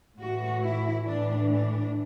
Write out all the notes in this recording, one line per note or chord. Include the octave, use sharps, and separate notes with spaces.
A2 E3 F#4
E4
A2 E3 D4
D4